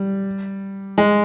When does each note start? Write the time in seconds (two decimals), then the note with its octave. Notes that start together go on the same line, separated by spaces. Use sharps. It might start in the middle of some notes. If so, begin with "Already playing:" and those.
Already playing: G3
0.98 G#3